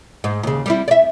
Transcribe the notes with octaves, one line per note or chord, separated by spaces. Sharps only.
G#2
D#2 C#3
G3 C4 E4
D5 E5